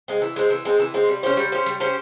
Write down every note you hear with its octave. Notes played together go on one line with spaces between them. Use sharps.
G#3 C4
E3
G#3 C4
E3
G#3 C4
E3
G#3 C4
G3
C#4 G4 C5
G3
C#4 G4 C5
G3
C#4 G4 C5